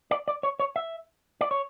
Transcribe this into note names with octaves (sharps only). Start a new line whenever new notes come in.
D5
D5
C#5
C#5
E5
D5
C#5